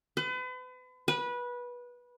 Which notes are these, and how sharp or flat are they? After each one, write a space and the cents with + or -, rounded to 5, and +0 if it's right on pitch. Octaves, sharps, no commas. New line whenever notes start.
B4 +40
B4 -20